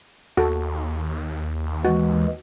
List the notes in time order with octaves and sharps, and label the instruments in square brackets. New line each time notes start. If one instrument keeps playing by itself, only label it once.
[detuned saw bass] D#2 [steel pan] F#4 A4
[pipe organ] E3 G#3 [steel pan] F#4